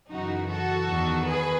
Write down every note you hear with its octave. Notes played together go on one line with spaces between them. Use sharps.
F#2 C#3 E3 D#4 F#4
F#4 A4
E2 D#3
G#4 B4